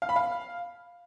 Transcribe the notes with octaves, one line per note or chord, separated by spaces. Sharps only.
F5
B5
F5